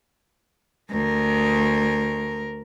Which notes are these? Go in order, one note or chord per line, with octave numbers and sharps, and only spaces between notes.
D2 A#4